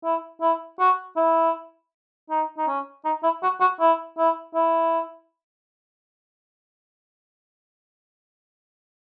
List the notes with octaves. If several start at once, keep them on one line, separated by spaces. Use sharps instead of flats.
E4
E4
F#4
E4
D#4
D#4
C#4
D#4
E4
F#4
F#4
E4
E4
E4